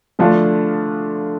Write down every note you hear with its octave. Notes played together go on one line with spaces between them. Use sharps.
D3 F3 A3 D4 F4